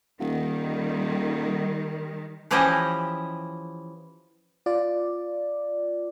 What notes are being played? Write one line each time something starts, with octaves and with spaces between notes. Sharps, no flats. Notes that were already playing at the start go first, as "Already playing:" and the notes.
D#1 D#3 G3
E3 F3 C#4 E4 G4 D#5
F4 D5